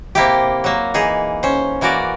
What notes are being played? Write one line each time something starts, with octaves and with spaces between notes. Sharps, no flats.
C3 A#3 E4 G4
F#3 A#3
E3 D#4 G#4
C#4 C5
E3 A#3 F#4 A#4 D5